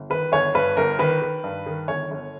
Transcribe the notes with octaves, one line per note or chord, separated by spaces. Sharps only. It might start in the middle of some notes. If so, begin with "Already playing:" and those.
Already playing: G1
D#3 B4
G1 C#5
G2 B4
G1 A#4
D#3 B4
D#3
G2
D#3
G1 C#5
G1